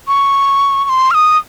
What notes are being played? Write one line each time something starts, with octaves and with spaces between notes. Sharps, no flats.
C#6
C#6
C6
F6
D#6